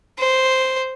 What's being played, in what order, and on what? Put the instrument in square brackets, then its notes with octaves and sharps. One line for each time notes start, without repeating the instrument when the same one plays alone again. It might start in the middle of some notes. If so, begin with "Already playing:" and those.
[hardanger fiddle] C5